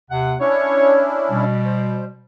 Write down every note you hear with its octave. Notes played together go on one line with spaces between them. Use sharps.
D#2 C3 F#5
C#4 D4 E4 C#5
B2 G3
C5